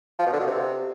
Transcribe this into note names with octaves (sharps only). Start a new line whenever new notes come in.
F3
B2
D3
B2
C3